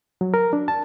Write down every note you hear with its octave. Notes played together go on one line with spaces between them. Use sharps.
F#3
A#4
D4
A5